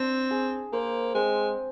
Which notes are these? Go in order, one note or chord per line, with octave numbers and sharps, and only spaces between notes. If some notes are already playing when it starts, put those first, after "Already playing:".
Already playing: C4 D4
G#4
A#3 C5
G#3 C4